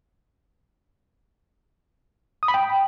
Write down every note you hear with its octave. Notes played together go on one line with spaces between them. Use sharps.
D#6
B5
G5